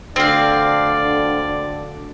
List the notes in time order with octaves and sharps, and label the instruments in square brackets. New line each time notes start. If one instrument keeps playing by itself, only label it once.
[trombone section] D2 D3 [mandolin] C4 F5 [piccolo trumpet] D5